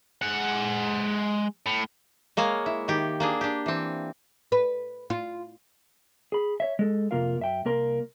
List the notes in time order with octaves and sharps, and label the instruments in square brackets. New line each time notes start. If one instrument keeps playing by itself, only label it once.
[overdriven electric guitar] G#3 F#5
A2
[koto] G#3 A#3 C#5 F5
E4
D#3 G4
A#3 D4 G#4
D4 G4
E3 C4
[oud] B4
F4
[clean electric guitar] G#4 B5
C#5 E5
G#3 A4
F2 C3 A#3 F4 A#4 F5
F#2 E5 G5
C2 A#3 A#4 C6